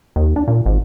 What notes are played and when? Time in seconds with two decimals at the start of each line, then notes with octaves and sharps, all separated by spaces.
0.16 D#2
0.36 D4
0.48 A#2
0.66 G#1